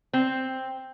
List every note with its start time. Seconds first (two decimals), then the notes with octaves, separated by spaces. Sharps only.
0.13 C4